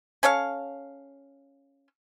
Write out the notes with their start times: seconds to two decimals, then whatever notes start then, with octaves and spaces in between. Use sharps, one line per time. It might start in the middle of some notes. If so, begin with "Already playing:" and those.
0.23 C#4 A4 C#5 F5